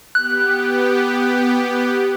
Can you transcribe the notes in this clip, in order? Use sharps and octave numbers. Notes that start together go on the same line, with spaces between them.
B3 G4 F#6